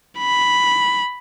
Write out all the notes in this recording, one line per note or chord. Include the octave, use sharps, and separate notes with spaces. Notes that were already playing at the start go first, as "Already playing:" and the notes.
B5